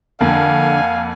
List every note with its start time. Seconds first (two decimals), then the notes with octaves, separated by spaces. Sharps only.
0.21 F2 D3 A#3 F5 F#5 G#5